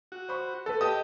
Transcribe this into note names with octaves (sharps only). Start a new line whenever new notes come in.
F#4
C5 B5 C#6
A4 B4
G4 D#5 A5 D#6